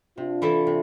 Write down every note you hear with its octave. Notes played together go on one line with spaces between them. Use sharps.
C3 D4 F4
E3 A3 E4 A4
C3